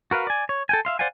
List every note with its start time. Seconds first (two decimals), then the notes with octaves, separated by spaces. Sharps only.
0.11 F#4 A#4 B4 F5
0.27 D5 G#5
0.49 C#5
0.69 A4 G5 G#5
0.85 E5 F5 C6
0.99 C5 D5 F5 F#5 G#5